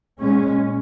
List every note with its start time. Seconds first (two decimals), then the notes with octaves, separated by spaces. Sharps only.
0.19 A#2 G#3 C#4